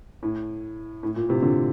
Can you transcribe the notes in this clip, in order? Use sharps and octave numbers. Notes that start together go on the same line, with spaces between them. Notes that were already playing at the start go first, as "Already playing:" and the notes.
A2
A2
A#2
A2 C3
A#2 D3